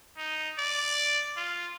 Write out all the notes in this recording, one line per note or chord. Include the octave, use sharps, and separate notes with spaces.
D#4
D5
F4